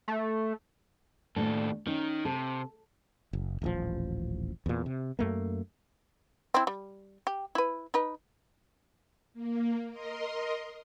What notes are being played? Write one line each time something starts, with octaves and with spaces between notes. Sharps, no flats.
A3
D#2 A2 D4 A4
D#3 C#4 D#4
C3 A4
F#1
D#1 A1 F3
E2 A#2
C3
F#2 A3 A#3
C4 E4
G3
G4
E4 B4
D#4 B4
A#3
A#4 D#5 C6